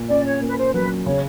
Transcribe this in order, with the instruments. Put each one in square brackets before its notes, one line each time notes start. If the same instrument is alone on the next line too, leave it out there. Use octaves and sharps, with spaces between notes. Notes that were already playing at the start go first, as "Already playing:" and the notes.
Already playing: [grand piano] A#2
[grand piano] C#4 [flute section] D5
[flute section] C#5
[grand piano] A#3
[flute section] B4
C5
[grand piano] F#3 [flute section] B4
[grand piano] C#3 [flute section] C#5